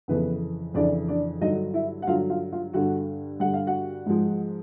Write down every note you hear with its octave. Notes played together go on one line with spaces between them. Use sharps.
F2 C#3 E3 B3 B4
F2 C#3 E3 D4 D5
D4 D5
G2 D3 F#3 D#4 D#5
E4 E5
F#5
G2 D3 F#3 F4 F5
F4 F5
F4 F5
G2 D3 G3 F#4 F#5
G2 D3 G3 F#5
F5
F#4 F#5
G#2 F3 G#3